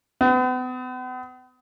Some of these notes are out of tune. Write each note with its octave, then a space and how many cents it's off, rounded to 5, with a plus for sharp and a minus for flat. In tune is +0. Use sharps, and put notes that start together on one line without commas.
B3 +40